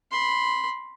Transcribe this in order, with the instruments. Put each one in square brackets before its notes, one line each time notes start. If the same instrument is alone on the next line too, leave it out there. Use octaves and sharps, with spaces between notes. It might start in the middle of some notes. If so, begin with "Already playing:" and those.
[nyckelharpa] B5 C6